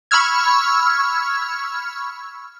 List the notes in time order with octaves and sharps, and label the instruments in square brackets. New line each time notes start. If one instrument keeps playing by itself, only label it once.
[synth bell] B5 C#6 E6 F6 G#6